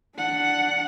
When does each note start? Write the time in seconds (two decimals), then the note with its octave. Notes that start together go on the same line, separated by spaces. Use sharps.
0.16 D4 F#5